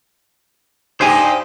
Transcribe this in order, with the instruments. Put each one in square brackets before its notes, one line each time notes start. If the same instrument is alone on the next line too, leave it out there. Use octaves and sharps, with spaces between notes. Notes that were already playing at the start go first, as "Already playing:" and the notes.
[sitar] G2 D#4 G4 [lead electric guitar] C5 G#5